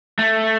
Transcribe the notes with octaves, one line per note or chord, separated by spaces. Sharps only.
A3